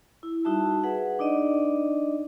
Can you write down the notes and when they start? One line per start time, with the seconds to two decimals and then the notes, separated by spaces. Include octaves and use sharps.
0.23 E4
0.45 G3 D#4 F#4 E5 A5
0.84 G#4 B4 E5 F#5
1.19 D4 D#4 D5 D#5